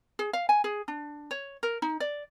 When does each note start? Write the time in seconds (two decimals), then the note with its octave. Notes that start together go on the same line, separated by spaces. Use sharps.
0.19 G#4
0.33 F5
0.49 G#5
0.64 G#4
0.88 D4
1.31 C#5
1.63 A#4
1.82 D#4
2.00 D5